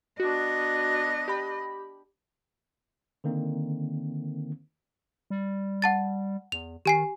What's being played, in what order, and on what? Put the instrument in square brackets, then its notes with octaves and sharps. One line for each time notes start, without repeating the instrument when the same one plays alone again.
[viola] B3 D4 [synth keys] F#4 [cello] D#5
[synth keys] G4 B5
[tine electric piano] D3 D#3 A#3 C4
[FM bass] G3
[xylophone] F#5 A5 A6
[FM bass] E2 [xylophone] F7
[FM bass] D#3 [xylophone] G4 G#5 C7